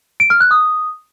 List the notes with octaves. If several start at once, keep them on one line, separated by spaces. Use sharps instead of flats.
D7
F6
F#6
D#6